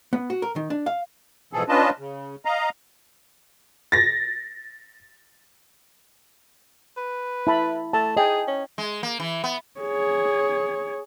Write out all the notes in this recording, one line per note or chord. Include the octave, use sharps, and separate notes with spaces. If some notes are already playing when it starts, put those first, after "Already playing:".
B3
F#4
A#4
D#3
D4
F5
G#2 B2 E3 F3 G#4 A4
C#4 D4 F4 B4 D#5 A5
C#3
D#5 F5 A#5
A6 A#6
B4
E4 A5 B5
A3 A5
G#4 D#5 G5 G#5
C#4
G#3
A#3
E3
B3
G#4 C#5